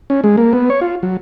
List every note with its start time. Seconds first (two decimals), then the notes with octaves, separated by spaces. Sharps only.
0.10 C#4
0.24 G#3
0.37 A#3
0.53 B3
0.70 C#5
0.81 F4
1.03 F#3